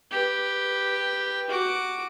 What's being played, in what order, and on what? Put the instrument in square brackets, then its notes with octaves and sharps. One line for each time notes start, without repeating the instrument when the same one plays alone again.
[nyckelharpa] G4 B4
F#4 D6